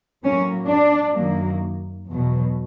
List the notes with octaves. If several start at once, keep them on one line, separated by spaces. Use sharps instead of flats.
A2 F#3 A#3 C#4
D4
F#2 D#3 F#3 A#3
E2 B2 F#3